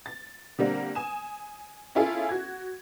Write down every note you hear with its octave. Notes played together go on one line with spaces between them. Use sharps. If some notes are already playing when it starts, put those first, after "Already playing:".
A6
D3 G3 A#3 C4
G#5 D#6 E7
C#4 E4 F4 G#4 A4
F#4 G#6